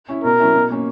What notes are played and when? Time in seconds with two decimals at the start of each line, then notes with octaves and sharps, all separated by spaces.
0.09 C#4 E4
0.24 B2 A#4
0.40 F#3 C#4 E4
0.55 B2
0.70 A#3 C#4